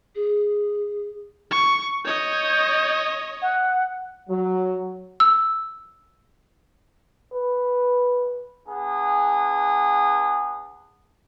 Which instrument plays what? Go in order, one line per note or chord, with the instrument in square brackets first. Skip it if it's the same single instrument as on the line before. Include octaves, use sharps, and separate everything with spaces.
[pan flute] G#4
[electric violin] C#6
[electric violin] C#5 D#5 [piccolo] G6
[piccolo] F#5
[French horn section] F#3
[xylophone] E6
[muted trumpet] B4
[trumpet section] B3 D4 G#4